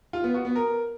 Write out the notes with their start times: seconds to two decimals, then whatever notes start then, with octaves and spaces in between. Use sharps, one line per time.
0.13 F4
0.24 B3
0.34 F#4
0.45 B3
0.55 A#4